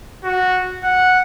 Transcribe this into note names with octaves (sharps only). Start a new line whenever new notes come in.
F#4
F#5